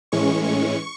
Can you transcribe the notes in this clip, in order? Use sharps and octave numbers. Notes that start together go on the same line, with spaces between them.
A2 E3 G#3 C#4 C#6
C#6